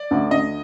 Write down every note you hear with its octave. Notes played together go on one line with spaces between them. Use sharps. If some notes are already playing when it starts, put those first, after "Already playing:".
Already playing: D5
D2
D2 D#5